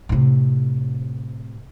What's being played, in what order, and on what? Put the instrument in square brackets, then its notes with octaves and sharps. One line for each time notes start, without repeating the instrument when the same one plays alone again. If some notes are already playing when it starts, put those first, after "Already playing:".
[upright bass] A2 C3